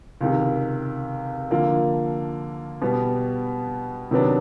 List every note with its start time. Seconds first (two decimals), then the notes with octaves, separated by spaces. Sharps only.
0.21 C#2 C3 D#3
1.51 D3 F3 A#3
2.82 B2 G3 B3
4.11 C3 D#3 F#3 B3 D4